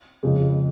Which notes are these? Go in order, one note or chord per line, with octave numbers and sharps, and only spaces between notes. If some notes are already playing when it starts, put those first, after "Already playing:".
F2 C#3 G#3